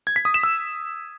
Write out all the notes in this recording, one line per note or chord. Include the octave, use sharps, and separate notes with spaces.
G#6
B6
D#6
E7
E6